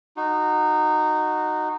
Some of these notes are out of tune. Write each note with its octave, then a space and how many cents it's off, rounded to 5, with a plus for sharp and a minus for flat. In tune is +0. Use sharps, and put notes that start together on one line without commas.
D#4 -15 F#4 -5